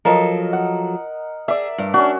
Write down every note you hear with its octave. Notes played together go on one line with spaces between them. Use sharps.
F3 F#3 A4 A#4 D#5
F#5
G#4 D5 E5
G2
C#4 D4 F#4